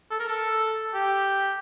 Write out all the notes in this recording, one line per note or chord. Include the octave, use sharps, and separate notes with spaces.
A4
A#4
A4
G4